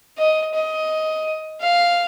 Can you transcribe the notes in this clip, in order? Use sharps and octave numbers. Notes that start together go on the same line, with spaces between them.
D#5
D#5
F5